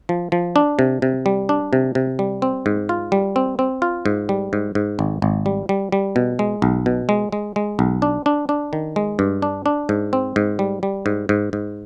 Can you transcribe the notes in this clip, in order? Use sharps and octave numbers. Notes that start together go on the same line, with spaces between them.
F3
F3
D4
C3
C3
G3
D4
C3
C3
G3
C4
G#2
F4
G3
C4
C4
F4
G#2
G3
G#2
G#2
G#1
G#1
G3
G3
G3
B2
G#3
B1
B2
G#3
G#3
G#3
B1
D4
D4
D4
D#3
G#3
G2
D4
D4
G#2
C4
G#2
G3
G3
G#2
G#2
G#2